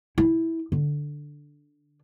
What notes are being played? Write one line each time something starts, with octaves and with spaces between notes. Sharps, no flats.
E4
D3